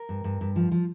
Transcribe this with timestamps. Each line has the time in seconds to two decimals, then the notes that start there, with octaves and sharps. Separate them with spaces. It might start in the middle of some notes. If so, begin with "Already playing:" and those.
Already playing: A#4
0.09 G2
0.24 G2
0.41 G2
0.56 F3
0.72 F3